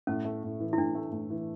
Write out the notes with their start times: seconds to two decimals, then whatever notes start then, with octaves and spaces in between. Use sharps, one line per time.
0.07 A2 C#4
0.25 A3
0.43 A2
0.60 E3
0.73 E4
0.78 A2 D4
0.95 A3
1.12 A2
1.30 E3